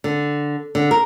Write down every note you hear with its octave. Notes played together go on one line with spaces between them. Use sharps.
D3
D3
A#4